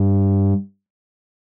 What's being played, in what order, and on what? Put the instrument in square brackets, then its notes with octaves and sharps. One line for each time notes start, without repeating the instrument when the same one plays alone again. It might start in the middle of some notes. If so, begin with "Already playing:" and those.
Already playing: [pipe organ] G2